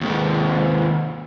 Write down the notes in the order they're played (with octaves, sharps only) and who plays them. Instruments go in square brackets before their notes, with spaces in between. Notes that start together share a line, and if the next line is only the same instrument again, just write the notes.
[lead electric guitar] D#2 G#3